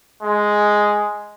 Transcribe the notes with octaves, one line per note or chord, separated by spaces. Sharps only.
G#3